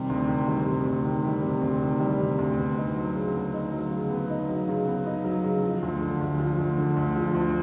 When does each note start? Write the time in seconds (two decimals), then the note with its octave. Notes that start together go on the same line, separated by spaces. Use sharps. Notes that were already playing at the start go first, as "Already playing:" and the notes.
Already playing: C3 D#3 G3
0.09 D2
0.28 D#3
0.48 G3
0.66 C3
0.85 D2
1.04 D#3
1.24 G3
1.43 C3
1.61 D2
1.81 D#3
2.00 G3
2.20 C3
2.38 D2
2.58 B3
2.77 D#4
2.96 F#3
3.15 C#3
3.34 B3
3.54 D#4
3.72 F#3
3.92 C#3
4.10 B3
4.30 D#4
4.49 F#3
4.68 C#3
4.87 B3
5.06 D#4
5.24 F#3
5.44 C#3
5.63 F3
5.82 D2
6.01 D3
6.21 D2
6.40 F3
6.59 D2
6.77 D3
6.96 D2
7.16 F3
7.35 D2